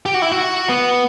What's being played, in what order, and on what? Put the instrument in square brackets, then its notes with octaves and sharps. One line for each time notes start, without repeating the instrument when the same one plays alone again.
[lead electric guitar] G4
F#4
E4
F#4
B3